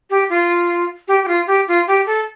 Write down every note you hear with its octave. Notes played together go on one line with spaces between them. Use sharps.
G4
F4
G4
G4
F4
G4
F4
G4
A4